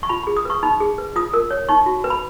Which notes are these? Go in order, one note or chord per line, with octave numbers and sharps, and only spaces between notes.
C#6
F4 B5
G#4 B5
D#6
B4 C#6
D#4 B5
G#4
B4
F4 D#6
A#4
C#5
D#4 C#6
F#4
B4
B5